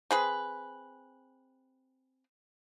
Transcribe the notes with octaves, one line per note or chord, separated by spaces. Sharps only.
C4 G#4 B4